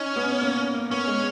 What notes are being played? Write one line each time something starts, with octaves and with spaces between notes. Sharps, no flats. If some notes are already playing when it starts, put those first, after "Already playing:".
Already playing: C#4 D#4
B3
A#3
A#3
B3 C#4
G#3